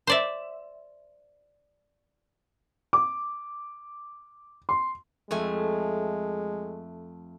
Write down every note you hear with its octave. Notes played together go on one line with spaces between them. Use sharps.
C5 D5 E5
D6
C6
F2 G#3 A3 G#5